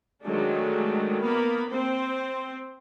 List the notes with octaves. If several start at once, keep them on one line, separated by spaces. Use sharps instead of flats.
D#3 F#3 G#3 A3 D4
A#3 B3 A#4 B5
C4 C5